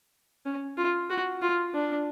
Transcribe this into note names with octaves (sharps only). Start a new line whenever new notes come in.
C#4
F4
F#4
F4
D4